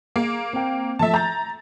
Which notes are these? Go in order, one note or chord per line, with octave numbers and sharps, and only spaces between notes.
A#3 G#4
C4 G5
F3 A3 E5 A5
A#5 G6 A6